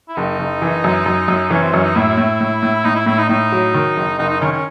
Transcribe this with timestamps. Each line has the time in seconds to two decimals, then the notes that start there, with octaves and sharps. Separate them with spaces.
0.09 E4
0.16 F#1 D#4
0.39 F#1
0.62 E3
0.84 F#2
1.06 F#2
1.28 F#2
1.50 E3 C#4
1.62 C4
1.73 F#2 C#4
1.84 D#4
1.95 A2 E4
2.17 A2
2.41 A2
2.63 A2
2.85 A2 D#4
2.95 E4
3.06 A2 E4
3.18 D#4
3.29 A2 D#4
3.52 F#3
3.74 D#3
3.96 F#1
4.19 F#1 D#4
4.29 D#4
4.41 D#3 C#4
4.52 C#4